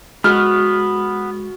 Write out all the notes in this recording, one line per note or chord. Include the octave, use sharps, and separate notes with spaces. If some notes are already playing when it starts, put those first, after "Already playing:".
G#3 B3 F#4 F6